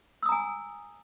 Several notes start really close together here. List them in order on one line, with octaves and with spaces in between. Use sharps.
E6 D#6 A#5 G#5